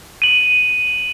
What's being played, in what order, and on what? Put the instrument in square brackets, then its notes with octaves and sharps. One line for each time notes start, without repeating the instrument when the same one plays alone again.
[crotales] D#7 F#7